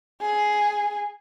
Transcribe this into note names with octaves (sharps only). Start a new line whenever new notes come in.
G#4